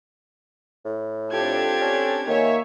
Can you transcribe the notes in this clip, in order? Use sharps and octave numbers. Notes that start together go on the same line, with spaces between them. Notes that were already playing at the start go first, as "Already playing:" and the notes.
A2
C4 D4 F4 G4 A4 G#6
C#4
D#3 A#3 C#5 E5 G#5